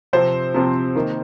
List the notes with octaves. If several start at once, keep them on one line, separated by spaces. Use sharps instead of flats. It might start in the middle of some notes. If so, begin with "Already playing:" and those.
C3 F3 C4 C5
C3 F3 C4
D#3 A#3